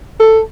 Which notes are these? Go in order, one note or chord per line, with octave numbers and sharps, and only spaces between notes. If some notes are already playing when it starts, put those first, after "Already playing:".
A4